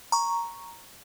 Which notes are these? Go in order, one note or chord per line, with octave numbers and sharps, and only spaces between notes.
A#5 C#6